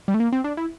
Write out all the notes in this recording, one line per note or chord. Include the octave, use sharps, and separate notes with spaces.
G3
A3
A#3
C4
D4
E4